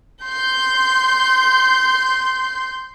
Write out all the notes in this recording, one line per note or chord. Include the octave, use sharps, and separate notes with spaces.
C6 G6